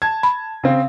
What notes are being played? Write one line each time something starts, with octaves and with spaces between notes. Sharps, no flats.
A5 G#6
B5
C#3 C4